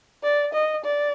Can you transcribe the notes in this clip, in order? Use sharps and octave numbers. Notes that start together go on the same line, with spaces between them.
D5
D#5
D5